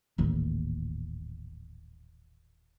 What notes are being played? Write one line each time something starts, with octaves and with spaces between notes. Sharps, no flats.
D#1 A1 D#2